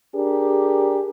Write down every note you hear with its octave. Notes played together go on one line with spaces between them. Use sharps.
D4 G4 G#4 A#4